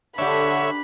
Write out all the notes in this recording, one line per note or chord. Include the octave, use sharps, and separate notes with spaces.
D3 D4 G4 C#5 E5 B5